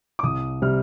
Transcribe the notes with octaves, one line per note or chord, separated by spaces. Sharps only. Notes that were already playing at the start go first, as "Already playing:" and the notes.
D6
C2 D#6
C3 G3 F6